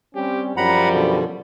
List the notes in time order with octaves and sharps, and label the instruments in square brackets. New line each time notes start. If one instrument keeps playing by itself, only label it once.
[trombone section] G3 C4 C#4 [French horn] G4
[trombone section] F#2 F3 [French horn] G3 [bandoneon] F#5 A#5 B5
[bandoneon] B2 D3